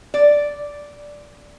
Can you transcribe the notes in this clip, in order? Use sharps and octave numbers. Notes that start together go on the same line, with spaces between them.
D5